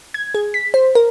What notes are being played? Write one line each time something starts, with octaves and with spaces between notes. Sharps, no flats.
G#6
G#4
B6
C5
A#4